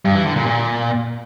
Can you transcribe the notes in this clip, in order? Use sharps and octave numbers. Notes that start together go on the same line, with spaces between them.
G2
E3
D3
A#2
A#2